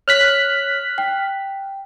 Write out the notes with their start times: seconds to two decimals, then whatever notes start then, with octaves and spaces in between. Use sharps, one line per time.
0.08 C#5 F6 F#6 B6
0.98 G5